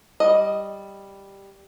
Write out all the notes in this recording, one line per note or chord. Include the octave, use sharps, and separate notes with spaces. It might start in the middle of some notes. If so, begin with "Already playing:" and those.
G3 D#5